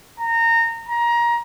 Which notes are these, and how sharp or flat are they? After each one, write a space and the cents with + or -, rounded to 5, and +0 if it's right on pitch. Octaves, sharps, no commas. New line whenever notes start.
A#5 -20
A#5 +20